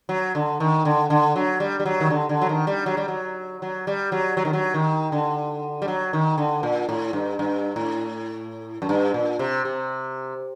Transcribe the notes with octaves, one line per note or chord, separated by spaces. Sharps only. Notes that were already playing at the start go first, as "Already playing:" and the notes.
F#3
D3
D#3
D3
D3
F#3
G3
G3
F#3
D#3
D3
D3
F#3
D#3
G3
F#3
G3
F#3
F#3
G3
F#3
F#3
D#3
F#3
D#3
D3
G3
F#3
D#3
D3
A#2
A2
G2
G2
A2
F#2
G2
A#2
C3
C3